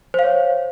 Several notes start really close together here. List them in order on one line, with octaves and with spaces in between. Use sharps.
C5 F5 C#5